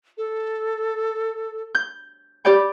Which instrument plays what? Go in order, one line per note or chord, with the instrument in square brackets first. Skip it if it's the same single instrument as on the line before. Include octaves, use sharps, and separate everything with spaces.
[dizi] A4
[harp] G6
[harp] G4 D5 G5 [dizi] B5